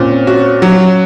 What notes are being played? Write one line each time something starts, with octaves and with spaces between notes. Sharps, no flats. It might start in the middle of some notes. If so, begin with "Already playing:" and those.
Already playing: A#2 C4 C#4 C#5
F#4
F#3